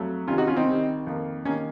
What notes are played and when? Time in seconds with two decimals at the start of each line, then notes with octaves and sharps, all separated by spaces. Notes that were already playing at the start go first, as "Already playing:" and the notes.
Already playing: F2 F#3 A3
0.28 C2 C3 D#3 C#4 F4
0.38 D#4 F#4
0.47 C#4 F4
0.57 C4 D#4
0.66 C2 C3 D#3
1.07 F2 D#3 A#3
1.45 D#3 A#3 C#4